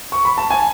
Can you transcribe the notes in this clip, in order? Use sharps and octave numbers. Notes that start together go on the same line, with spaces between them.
C#6
B5
A5
G#5